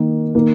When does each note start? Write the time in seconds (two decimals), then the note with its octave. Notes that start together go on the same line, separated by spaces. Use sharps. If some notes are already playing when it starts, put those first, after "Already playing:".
Already playing: D#3 A#3
0.35 D#3 A#3